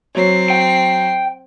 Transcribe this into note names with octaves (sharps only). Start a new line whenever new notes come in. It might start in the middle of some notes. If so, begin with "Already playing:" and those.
F#3 C4 C#5 C7
G5